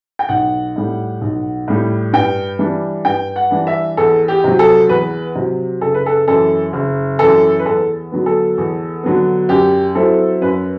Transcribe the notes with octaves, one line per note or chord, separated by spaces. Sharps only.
G5
B1 F#5
A2 G3
B1
A2 G3
G2 G5
E3 G3 D4
G2 G5
F#5
E3 G3 D4
E5
E2 A4
G4
C3 F#3
A4
E2 B4
C3 F#3
F#1 A4
B4
A4
F#2 E3 A4
F#1
F#2 E3 A4
B4
E2 A4
D3 F#3 B3
A4
E2
D3 F#3 B3
F#2 G4
F#3 C4 E4 A4
F#2 B4